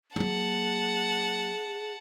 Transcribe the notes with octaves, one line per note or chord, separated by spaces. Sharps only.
F#3 A#3 G#4 F#5 A5